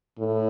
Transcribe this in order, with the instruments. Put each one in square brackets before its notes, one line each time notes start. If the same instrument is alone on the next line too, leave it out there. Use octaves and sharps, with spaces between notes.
[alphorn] A2